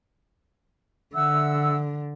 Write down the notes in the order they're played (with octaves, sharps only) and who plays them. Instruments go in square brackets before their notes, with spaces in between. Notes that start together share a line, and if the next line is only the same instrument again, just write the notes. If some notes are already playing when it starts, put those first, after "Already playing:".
[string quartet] D3 [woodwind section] E5 F#5 E6